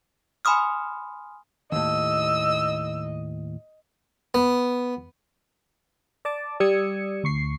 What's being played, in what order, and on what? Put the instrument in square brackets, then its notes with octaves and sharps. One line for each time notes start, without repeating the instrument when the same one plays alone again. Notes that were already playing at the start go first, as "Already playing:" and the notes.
[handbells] G#5 B5 C6 D#6 F6
[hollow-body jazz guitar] D#2 A2 [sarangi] D#5 [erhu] E6
[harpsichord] B3
[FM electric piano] D5 A5 D6
G3 D5 D#6 E6 G#6 C#7
D2 C#6 C7